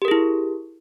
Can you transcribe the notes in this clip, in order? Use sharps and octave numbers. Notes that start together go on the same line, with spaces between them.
E4 G4 G#4 A#4